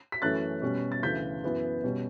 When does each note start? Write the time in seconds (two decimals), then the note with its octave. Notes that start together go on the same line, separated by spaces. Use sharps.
0.12 B6
0.22 F#2 E3 A3 C#4 F#6 A6
0.62 B2 G3 C#4
0.92 A6
1.03 D2 C#3 E3 G6 B6
1.43 F#2 E3 B3
1.84 B2 G3 C#4